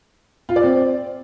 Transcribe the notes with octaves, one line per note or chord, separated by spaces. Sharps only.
F4
D5
C4